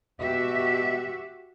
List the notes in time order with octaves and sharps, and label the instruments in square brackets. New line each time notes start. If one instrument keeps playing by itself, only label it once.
[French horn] B2 [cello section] F#4 G4 E5